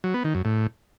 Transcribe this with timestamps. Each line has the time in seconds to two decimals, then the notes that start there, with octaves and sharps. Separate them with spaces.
0.04 F#3
0.14 B3
0.24 D#3
0.35 F#2
0.45 A2